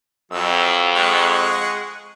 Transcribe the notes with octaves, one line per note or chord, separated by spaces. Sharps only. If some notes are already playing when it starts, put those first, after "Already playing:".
F2 F#3 E6
G#3 F#5 C#6